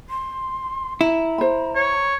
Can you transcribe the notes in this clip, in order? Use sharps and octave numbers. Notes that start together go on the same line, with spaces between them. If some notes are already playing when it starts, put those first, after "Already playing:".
C6
E4 A#5
C5 B5
C#5